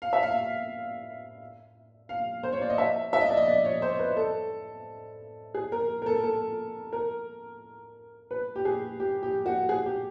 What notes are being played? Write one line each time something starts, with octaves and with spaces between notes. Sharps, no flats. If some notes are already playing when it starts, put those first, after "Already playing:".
F5
E5
F5
F5
C5
C#5
D5
D#5
E5
E5
D#5
D5
D#5
D5
C#5
C5
B4
A4
G#4
A#4
A#4
A4
A4
A#4
B4
G4
G#4
G4
G4
F#4
G#4
G4